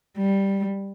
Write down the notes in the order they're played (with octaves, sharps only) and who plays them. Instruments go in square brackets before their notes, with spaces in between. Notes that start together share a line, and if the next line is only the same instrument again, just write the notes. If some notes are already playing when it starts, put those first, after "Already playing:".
[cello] G3